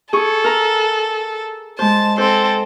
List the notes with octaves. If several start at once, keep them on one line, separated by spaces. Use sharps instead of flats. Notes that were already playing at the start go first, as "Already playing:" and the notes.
G#4 A4 C#6
A#4 A#5
G#3 C5 A5
C4 A4 C5